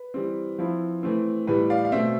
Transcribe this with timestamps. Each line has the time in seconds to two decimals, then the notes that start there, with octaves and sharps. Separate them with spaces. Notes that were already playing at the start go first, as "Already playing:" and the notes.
Already playing: B4
0.14 E3 G3 C4
0.59 F3 C4 E4
1.03 E3 A3 C4
1.47 A2 E3 G3 B4
1.70 D5 F5
1.85 F5
1.92 B2 A3 C4 C5 E5